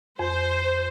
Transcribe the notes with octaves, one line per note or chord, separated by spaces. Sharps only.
F2 C5